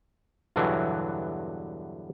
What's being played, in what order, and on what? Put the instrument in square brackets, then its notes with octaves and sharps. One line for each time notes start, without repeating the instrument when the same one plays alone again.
[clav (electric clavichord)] E2 G2 B2 D3 E3 F#3